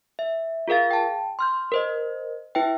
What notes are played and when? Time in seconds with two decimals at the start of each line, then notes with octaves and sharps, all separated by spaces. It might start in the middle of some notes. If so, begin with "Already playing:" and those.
0.19 E5
0.68 F4 G#4 A#4 F5 A6
0.91 G5 A5
1.39 C6 F6 G6
1.72 A#4 C5 D#5
2.55 E4 B4 E5 G5